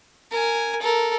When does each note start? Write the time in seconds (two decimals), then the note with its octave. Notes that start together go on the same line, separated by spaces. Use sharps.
0.31 A#4 G#5
0.81 A4 A#4